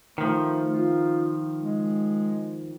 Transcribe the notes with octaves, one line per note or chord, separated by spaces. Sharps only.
D#3 F3 A3
F4
G#3